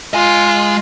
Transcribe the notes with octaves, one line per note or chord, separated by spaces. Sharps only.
G#3 F4 G#5